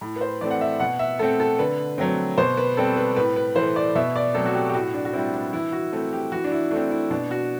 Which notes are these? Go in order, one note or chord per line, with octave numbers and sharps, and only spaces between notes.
A2
B4
C5
E3 A3 C4 D5
F#5
E5
B2 F#5
E5
A3 C4 A4
A4
D3 B4
F#3 A3 C4
B2 C5
B4
G3 C4 A4
B4
A2 B4
B4
E3 A3 C5
D5
B2 E5
D5
F#3 A3 C4 A4
F#4
G4
G4
A2 F#4
D4
F#4
G3 C4 E4
D4
E3 E4
F#4
A3 C4
G4
E3 F#4
D4
E4
A3 C4 D4
E4
B2 D4
F#4